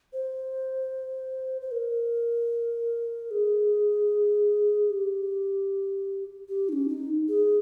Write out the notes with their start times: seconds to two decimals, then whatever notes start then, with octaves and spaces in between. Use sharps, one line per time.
0.13 C5
1.61 C5
1.71 A#4
3.31 G#4
4.90 G4
6.49 G4
6.69 D#4
6.73 C#4
6.88 D#4
7.28 G#4